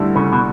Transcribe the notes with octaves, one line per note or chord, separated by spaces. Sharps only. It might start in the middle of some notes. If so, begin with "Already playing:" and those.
Already playing: G2 D3 A3 E4
C#3
B2